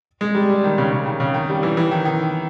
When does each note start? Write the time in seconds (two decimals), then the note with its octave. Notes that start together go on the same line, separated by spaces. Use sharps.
0.21 G#3
0.35 G3
0.49 G3
0.64 D#3
0.78 C#3
0.92 C#3
1.06 D#3
1.20 C#3
1.34 D#3
1.49 G3
1.63 E3
1.77 E3
1.91 D#3
2.05 D#3